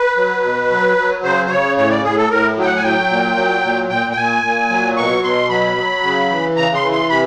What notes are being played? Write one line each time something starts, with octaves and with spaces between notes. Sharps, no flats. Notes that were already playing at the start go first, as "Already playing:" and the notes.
Already playing: B4
F#3
B2
F#3
F#3
C#3 C5
C5
C#3 C#5
A2 C#5
D5
A2 G#4
A4
A2 A#4
F#3 G5
F#5
G#5
F#3 G5
A#2
F#3
A#2
A#2 G5
G5
A#2 G#5
A#2
F#3
B2 C#6
B2 C6
F#3 B5
F#3
C#3
E3
C#3 A#5
C6
E3
C6
C3 B5